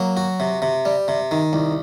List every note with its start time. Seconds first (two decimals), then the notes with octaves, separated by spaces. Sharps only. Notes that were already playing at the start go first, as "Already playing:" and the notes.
Already playing: F#3 A#3
0.17 F#4
0.40 C3
0.62 C3
0.85 G3
1.08 C3
1.31 D#3
1.53 C2